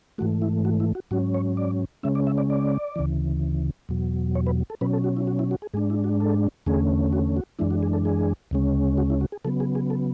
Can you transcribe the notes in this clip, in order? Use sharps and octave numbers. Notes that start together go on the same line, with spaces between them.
G#2 E3 A3 F#4
E4
F#4
E4
F#4
G#2 F#3 C#4 F#4
C#5
D5
C#3 G#3 C#4 E5
D5
E5
D5
D5
D2 C#3 E3
E2 B2 F#3
C#5
B4
A4
B2 F#3 C#4 B4
A4
F#4
E4
F#4
E4
F#4
G#4
G#2 G#3 D4 G#4
E4
F#4
A4
E2 D3 A3 C#4 G#4
F#4
F#4
F#2 E3 G#3 D4 E4
F#4
G#4
A4
G#4
D2 C#3 G#3 C#4
F#4
E4
F#4
G#4
C#3 F#3 B3 A4
G#4
G#4
A4